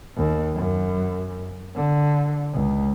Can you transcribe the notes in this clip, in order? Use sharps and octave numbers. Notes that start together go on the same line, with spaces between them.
D#2
F#2
D3
C#2